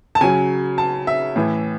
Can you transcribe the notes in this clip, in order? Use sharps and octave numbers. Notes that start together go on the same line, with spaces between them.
A5
C#3 F#3 G#5
A5
E5
A2 E3